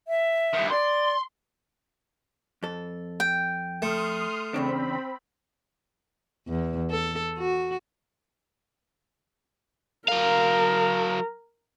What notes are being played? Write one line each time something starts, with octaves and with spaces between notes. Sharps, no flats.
E5
G2 D#3
D5 C6
F2 A4
G5
A3 C6 D#6 F6
E2 C#3 C4 D4 B5
E2
A4
F#4
F#3 A#4 F5